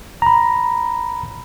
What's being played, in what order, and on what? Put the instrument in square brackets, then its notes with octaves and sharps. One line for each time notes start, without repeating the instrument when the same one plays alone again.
[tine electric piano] A#5 B5